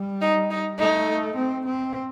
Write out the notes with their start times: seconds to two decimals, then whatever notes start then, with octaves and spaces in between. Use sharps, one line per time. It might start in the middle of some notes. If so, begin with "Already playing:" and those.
Already playing: G3
0.21 D#4
0.50 D#4
0.79 A3 D#4
1.36 C4
1.66 C4